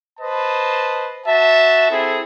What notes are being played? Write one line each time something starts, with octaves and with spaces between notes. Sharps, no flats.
B4 C5 D#5 A5
F#4 E5 A5
C4 E4 G#4 A4